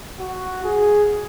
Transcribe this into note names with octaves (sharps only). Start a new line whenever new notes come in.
F#4
G#4